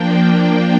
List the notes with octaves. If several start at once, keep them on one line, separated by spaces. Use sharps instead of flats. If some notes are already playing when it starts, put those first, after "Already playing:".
Already playing: F3 A#3 D4 G5